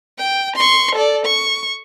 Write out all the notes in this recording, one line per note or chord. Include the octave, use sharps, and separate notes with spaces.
G5
C6 C#6
A4 D5
C#6